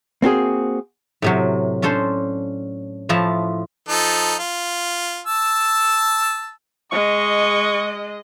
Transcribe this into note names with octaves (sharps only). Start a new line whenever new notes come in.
A#3 C4 F#4 G#4
A2 C3 F#3
C#4 D4 A4 C5 C6
A2 F3 E4 A5 A#5
F3 D#4 A4
F4
A5 E6
G#3 D#5 C#6